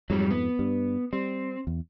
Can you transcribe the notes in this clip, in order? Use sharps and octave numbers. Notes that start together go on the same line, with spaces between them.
F2 G#2 F#3 G3
B3
G2
G3 C4
E2